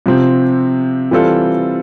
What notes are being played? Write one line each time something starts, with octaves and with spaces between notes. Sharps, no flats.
C3 F3 C4
E3 G3 C4 F4 A4